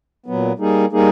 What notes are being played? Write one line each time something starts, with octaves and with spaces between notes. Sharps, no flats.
A#2 F#3 B3
G3 A#3 D#4 G#4
G3 A#3 D#4 G#4